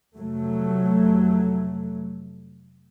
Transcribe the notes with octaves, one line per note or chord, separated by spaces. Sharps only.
F1 F#3 A3